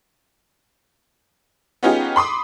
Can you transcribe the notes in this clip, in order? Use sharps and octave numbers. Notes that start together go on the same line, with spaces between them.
B3 C#4 D#4 F4 G4 G#4
B5 C6 D6 D#6